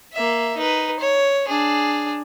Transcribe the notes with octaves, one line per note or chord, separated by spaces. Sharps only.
A#3 E5
D#4 B4
C#5
D4 G#4